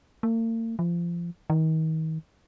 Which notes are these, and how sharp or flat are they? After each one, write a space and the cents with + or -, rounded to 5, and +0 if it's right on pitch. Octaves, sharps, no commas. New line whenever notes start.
A#3 -45
F3 -25
D#3 +35